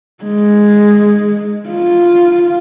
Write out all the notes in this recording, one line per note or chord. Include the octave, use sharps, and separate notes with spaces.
G#3
F4